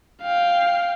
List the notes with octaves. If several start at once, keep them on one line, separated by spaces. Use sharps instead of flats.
F5 G5